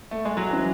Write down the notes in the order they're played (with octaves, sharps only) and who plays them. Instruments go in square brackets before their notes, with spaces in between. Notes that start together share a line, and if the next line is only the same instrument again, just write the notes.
[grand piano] A3
G#3
F#3
[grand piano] E3 [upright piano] F#3 C#4 F#4